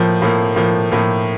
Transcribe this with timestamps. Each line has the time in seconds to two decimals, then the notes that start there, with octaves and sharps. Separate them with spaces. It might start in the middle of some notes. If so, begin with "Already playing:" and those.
Already playing: A2 F3 A#3
0.22 A2 F3 A#3
0.56 A2 F3 A#3
0.91 A2 F3 A#3